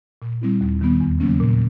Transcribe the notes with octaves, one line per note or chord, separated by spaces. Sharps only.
A#2
G3 C4 E4
D#2
D#3 G3 B3
E2
C#3 F#3 A#3 C#4
A#2